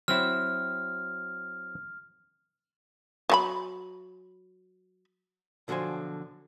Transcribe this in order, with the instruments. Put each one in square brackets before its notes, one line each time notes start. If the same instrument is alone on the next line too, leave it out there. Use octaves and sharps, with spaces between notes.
[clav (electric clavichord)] F#3 C4 E4 [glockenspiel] F6
[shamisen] F#3 F#4 B5
[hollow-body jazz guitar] B1 D3 F3 F#4 C5 G#5